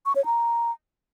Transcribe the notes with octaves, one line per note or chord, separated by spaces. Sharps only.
C#6
C#5
A#5